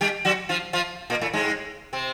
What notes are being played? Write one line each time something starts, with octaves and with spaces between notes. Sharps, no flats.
G3 G4
F#3 F#4
F3 F4
F3 F4
A#2 A#3
A2 A3
G#2 G#3
C3 C4